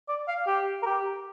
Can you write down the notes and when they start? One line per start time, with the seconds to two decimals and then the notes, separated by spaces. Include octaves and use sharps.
0.08 D5
0.28 F5
0.47 G4
0.83 A#4
0.86 G4